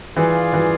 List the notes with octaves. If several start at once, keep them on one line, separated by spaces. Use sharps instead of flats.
E3 F4 G#4 D5 F5
E3